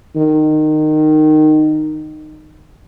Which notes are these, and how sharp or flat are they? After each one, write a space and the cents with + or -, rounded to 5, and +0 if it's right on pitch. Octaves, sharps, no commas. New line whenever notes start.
D#3 -15